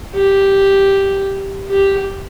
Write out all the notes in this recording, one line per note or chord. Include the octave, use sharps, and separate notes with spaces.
G4
G4